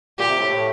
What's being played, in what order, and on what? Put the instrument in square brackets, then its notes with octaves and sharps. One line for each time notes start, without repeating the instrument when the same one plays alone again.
[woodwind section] A#2 [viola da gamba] G4
[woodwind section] C3
A2
A2